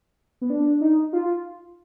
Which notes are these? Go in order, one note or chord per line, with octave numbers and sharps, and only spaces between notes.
B3
D4
D#4
F4